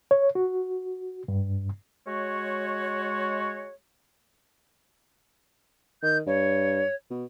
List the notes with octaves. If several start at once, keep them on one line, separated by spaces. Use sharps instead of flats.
C#5
F#4
G2
G#3 F#4 C#5
D#3 G6
G2 C#5
B2